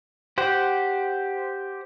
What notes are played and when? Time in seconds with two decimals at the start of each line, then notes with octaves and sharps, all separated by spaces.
0.38 G4 C5 F#5